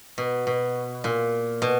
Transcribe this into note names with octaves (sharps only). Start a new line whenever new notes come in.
B2
B2
A#2
B2